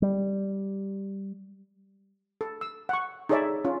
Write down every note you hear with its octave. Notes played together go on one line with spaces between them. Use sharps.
G3
A4
E6
F#5 C#6
D#4 G#4 A4 C#5 D5 E5
C#4 F4